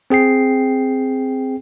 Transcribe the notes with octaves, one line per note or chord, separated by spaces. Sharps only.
C4 G#4 G5 C7